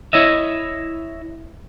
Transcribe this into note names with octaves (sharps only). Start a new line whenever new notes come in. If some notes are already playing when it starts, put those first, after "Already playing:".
E4 C#5 D#5 E5